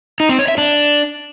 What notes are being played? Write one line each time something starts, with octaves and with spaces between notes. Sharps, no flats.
D#4
C4
C#5
E5
D4